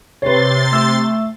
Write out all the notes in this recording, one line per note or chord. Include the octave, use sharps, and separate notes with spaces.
C3 B4 C#5 C6 A6
A3 E6